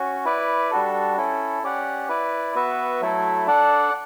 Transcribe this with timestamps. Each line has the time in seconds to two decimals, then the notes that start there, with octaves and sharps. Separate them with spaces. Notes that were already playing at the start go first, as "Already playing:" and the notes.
Already playing: C#4 F#4
0.25 E4 B4 D5
0.71 G3 D4 F#4 A4
1.17 C#4 E4 A4
1.63 C#4 G4 D5 F#5
2.09 E4 B4 D5
2.55 B3 F#4 B4 E5
3.01 F#3 A3 E4 A4
3.47 D4 A4 D5 F#5